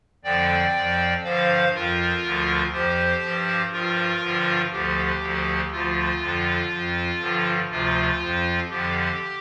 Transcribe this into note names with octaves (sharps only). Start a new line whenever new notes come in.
F2 D3 F3 D5 G5
F2 F3
G2 D3 F3 C5 F5
F2 F3 F4 A#4
D2 D3 F3
F2 F3 G4 C5
G2 F3
G2 F3 F4 A#4
G2 D3 F3
D2 D3 F3 G4
D2 D3 F3
D2 D3 F3 F4
F2 D3 F3
F2 F3
G2 D3 F3
D2 C3 F3 F4
F2 F3
F2 D3 F3 G4